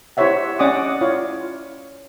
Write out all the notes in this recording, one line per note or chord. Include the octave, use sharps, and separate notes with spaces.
E4 G4 C5 C#5 E5 F#5
C#4 D5 D#5 F#5 D6 D#6
E4 F4 C#5 F5